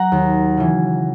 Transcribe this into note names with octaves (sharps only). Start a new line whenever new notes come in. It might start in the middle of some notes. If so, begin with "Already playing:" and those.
Already playing: F#3 F#5 A#5
D#2
C#3 E3